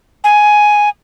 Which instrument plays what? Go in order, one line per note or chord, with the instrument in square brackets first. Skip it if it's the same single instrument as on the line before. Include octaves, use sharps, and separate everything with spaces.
[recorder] G#5